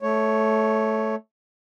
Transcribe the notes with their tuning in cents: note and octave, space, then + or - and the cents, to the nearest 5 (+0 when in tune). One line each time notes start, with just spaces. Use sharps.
A3 -10 C#5 +0